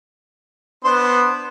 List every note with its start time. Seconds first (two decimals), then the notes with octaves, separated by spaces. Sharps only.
0.84 B3 D4 C5 C6